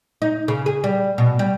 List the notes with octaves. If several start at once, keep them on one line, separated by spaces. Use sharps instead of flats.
D#4
C#3
G#4
G3
B2
G3